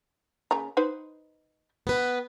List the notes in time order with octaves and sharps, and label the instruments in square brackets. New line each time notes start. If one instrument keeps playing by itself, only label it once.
[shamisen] C#3 A#3 A#5
D#4 B4 C5
[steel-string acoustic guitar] B3 B4